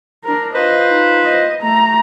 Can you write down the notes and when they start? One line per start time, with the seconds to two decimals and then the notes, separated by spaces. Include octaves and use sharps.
0.24 D4 A#4
0.54 F4 B4 C5 D#5
0.89 D#4
1.25 D#5
1.61 A3 A#5